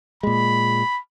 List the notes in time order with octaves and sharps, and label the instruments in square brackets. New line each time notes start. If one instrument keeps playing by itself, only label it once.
[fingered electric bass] A#2 G#3 [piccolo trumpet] B5